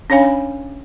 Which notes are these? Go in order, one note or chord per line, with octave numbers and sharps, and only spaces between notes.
C#4 D4 C#5 F5 G#5 B5